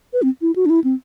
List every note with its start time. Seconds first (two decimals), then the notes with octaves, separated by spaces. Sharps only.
0.13 B4
0.22 C4
0.42 E4
0.56 F#4
0.66 D4
0.70 E4
0.84 C4